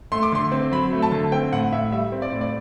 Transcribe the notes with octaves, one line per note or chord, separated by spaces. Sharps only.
A3 C6
D6
D3 C6
C4
F#3 B5
A3
A5
D3
C4 G5
A2 F#5
A2 E5
G3 E5
C4
D5
A2
D5